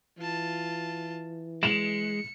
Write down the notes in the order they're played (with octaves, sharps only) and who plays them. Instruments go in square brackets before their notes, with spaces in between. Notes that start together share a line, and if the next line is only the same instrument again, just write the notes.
[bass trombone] E3 [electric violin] F4 A5
[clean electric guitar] G#3 [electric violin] C#7 [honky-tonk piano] E7 F7